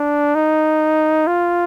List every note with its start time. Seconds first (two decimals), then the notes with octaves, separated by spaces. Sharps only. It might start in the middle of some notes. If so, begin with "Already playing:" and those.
Already playing: D4
0.35 D#4
1.27 F4